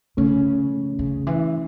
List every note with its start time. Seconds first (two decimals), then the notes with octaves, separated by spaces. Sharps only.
0.17 C#3 A3 C#4
0.99 C#3
1.27 E3